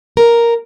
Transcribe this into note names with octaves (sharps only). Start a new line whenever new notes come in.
A#4